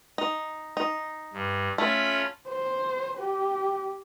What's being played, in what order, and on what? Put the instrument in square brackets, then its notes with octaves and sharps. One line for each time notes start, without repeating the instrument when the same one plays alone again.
[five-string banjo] D#4
D#4
[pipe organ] G2
[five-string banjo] A3 [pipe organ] C#4 F4 B5
[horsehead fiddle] C5
G4